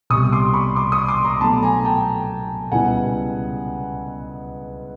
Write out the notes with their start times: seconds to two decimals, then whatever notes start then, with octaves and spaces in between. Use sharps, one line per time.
0.10 C2 B2 G3 C#6 D#6
0.32 C6 D6
0.54 B5 C#6
0.76 C6 D6
0.92 C#6 D#6
1.08 C6 D6
1.25 A#5 C6
1.41 B2 F#3 A3 A5 B5
1.63 G#5 A#5
1.84 G5 A5
2.72 C#2 B2 G3 B3 E4 F#5 G#5